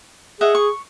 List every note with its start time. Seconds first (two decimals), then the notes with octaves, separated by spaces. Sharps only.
0.41 G#4 D#5 E5 F#5
0.55 C#6